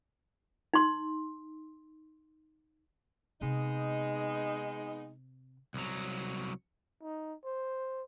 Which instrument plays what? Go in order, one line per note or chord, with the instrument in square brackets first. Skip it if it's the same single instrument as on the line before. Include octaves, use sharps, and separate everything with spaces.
[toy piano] D#4 C6
[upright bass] C3 [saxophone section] G#3 B3 D#4
[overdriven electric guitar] C2 F#3
[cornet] D#4
C5